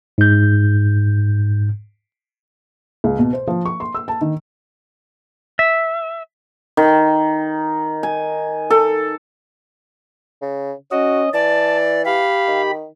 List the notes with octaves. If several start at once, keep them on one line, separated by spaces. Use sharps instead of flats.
G#2 G6
C#2
B2
C5
F3
C#6
C6
E6
A5
D#3
E5
D#3
G#5
A4
C#3
C#4 F#4 D#5
E3 D5 A5
G4 F5 B5
D#3